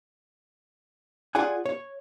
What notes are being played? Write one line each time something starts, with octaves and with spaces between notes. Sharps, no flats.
F4 G#4 D5 F#5 G#5
C#5